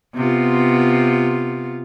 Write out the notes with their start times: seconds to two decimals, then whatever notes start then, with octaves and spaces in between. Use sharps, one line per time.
0.15 C3 B3 F4